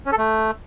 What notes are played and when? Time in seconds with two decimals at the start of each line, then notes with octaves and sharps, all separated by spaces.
0.06 C#4
0.12 A4
0.18 A3